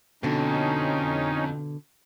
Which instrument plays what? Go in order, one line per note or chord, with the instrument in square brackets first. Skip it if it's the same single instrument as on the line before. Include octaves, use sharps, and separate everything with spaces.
[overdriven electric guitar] F2 [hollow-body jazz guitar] B2 D3 [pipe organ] C#4 D#4